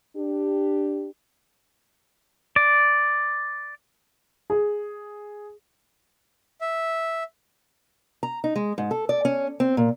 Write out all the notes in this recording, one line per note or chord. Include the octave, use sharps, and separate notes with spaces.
D4 G4
D5
G#4
E5
A#5
D#4
G#3
G#2
A4
D5
C#4
C4
A#2